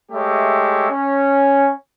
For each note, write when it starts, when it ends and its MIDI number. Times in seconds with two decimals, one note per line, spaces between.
0.12 0.89 56
0.12 0.89 57
0.12 0.89 67
0.12 0.89 73
0.12 0.89 76
0.91 1.71 61